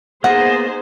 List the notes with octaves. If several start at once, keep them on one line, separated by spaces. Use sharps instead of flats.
A#3 B3 D#4 G#4 C5 D#5 F#5